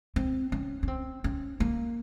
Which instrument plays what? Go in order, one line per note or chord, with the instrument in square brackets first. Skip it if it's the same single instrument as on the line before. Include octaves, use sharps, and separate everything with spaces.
[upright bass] C4
C#4
C#4
C4
C#4
A#3